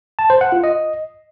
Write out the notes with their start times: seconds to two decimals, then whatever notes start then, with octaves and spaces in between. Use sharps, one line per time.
0.19 A5
0.30 C5
0.41 F#5
0.52 F4
0.64 D#5